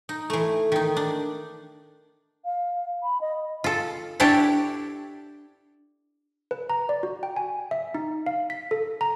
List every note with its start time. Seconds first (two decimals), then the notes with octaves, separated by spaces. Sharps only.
0.09 D#4
0.30 E3 A3
0.72 D#3 D#4
0.97 D4
2.45 F5
3.03 B5
3.21 D#5
3.64 F4 A4
4.20 D4 E4 G4 A4 C#5 F#5
6.51 B4
6.70 A#5
6.89 D5
7.03 F#4
7.23 G5
7.36 G#5
7.71 E5
7.95 D#4
8.26 F5
8.50 B6
8.71 A4
9.01 A#5